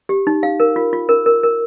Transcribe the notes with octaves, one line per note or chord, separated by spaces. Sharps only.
G4
D#4
F5
A#4
F4
F4
A#4
A#4
A#4